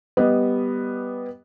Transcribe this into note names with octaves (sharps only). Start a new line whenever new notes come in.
G3 B3 D#5